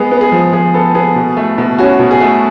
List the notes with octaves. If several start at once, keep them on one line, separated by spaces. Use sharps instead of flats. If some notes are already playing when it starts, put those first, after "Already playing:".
Already playing: G#3 B3 G#4
B3
G#4
F3
F3 G#4
B3 A4
B3 G#4
B2
A3
B2
C#4 F#4
B2
G#4
A3